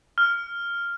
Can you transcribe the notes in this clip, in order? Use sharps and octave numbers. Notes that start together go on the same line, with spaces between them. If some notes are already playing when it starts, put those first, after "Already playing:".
F6